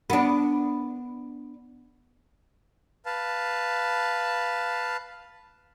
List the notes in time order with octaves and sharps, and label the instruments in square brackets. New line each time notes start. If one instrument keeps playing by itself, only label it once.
[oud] B3 D4
[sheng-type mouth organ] B4 F5 A5